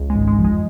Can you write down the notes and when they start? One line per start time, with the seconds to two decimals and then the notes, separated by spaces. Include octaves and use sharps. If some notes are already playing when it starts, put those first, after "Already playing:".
Already playing: C#2
0.10 G#3
0.15 G#1 G#2
0.27 G#3
0.33 D3
0.38 F2 F3
0.44 G#3